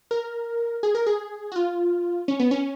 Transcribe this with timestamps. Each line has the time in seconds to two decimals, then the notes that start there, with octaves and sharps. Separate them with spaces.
0.11 A#4
0.83 G#4
0.95 A#4
1.07 G#4
1.52 F#4
1.56 F4
2.28 C#4
2.40 B3
2.51 C#4